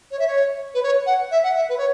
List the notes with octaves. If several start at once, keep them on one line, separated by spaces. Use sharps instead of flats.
C#5
E5
C#5
B4
C#5
F#5
E5
F#5
E5
B4
C#5